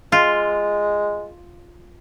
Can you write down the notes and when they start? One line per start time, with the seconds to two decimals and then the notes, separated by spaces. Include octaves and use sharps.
0.12 G#3 F4